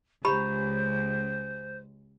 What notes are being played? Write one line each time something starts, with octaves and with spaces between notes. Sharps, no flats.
C#2 G4 C5 A#5 B5